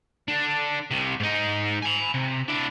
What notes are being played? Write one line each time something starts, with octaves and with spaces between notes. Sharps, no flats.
D3 D4
C2 C3
G#2 D#4
G#5 B5
C3
D4 E4